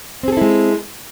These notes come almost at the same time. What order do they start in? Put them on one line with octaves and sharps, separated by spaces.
C4 G#4 A4 E4 G#3